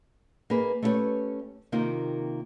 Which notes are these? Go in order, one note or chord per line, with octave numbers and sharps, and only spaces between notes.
A#3 D#4 G#4 B4
A3 C#4 E4 G4 B4 C#5
C3 D#3 A#3 D#4 F4 G4